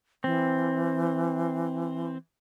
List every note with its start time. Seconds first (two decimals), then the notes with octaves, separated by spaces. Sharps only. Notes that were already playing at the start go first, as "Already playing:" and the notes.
0.24 E3 C4